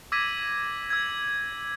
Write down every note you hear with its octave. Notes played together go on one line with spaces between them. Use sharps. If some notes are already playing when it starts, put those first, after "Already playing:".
D6 E6 G#6 A#6 B6 D#7
E6 G#6